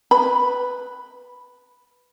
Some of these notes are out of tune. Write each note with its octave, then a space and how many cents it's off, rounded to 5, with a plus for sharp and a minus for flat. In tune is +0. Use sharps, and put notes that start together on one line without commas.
B4 +0 B5 +0